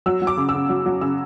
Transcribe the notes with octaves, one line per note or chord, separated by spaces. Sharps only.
F#3 E6
F#3
D6
C#3
E6
C#3
F#3
F#3
C#3 E6